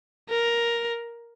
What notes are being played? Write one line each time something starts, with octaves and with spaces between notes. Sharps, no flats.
A#4